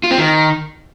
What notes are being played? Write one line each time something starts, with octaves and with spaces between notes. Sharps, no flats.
F4
C4
D#3